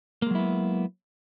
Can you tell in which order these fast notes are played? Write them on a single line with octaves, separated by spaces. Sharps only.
A#3 G#3 F#3 E4 B3